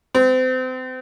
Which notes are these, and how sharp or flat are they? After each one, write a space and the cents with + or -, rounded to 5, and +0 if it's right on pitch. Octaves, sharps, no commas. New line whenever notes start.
C4 -30